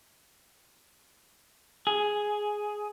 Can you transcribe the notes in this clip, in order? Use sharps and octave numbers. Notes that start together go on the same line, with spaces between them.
G#4